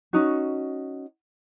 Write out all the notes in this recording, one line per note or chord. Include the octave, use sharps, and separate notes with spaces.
C#4 D#4 F#4